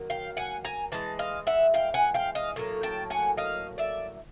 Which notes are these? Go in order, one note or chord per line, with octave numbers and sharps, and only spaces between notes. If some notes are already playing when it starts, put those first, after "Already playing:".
Already playing: D#3 F#3 A#3
F5 G5
F#5 G#5
G#5 A#5
E3 G#3 A5
D#5 F5
E5 F#5
F5 G5
F#5 G#5
F5 G5
D#5 F5
A2 F#3 A#3
G5 A5
F#5 G#5
D#5 F5
D5 E5